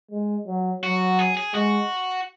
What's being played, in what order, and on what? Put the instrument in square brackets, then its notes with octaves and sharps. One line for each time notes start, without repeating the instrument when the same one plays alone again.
[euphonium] G#3
F#3
[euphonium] F#3 [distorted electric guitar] F#4
[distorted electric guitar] G#4
G#4
[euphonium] G#3 [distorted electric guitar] F#4